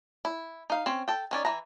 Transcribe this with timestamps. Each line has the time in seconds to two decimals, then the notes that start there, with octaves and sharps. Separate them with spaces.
0.25 E4
0.70 D#4 F5
0.86 C4 C#4
1.08 A4 G5
1.31 D#3 C#4 D5
1.45 E3 E4 A#5